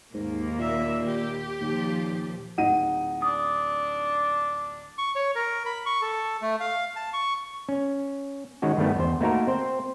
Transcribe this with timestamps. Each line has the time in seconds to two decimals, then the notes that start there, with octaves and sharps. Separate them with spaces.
0.14 D#2 G#2 A#3
0.59 A#2 E5
1.06 G4
1.61 D#2 A#2 F3
2.58 D1 D#4 F#5 D#7
3.22 D4 D#6
4.98 C#6
5.15 C#5
5.35 A#4
5.66 B5
5.86 C#6
6.02 A4
6.42 A3
6.60 F5
6.96 A5
7.13 C#6
7.69 C#4
8.62 D#3 G#3 C#4 F#4
8.77 G2 D#3 G3 A3 B3
8.95 E2 C5
9.20 A3 A#3 D#4 F#4 A4 A#4
9.47 C4 C5